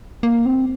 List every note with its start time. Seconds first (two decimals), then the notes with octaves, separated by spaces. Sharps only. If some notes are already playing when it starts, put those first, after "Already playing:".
0.23 A#3
0.46 C4